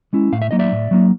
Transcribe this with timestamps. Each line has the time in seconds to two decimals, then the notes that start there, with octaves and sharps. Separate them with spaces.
0.13 G#3 C#4 E4
0.32 A2 F5
0.42 E5
0.51 F#3 A#3 D#4 D#5
0.59 D5 E5
0.72 A2
0.91 F#3 A#3 D#4